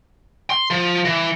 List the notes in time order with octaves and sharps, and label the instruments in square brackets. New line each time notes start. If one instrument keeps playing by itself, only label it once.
[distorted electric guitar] C6
F3
E3